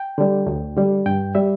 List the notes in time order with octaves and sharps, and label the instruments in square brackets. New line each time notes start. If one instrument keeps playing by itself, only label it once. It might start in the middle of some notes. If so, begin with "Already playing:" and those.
Already playing: [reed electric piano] G5
D3 G3
D2
D3 G3
G2 G5
G3 E5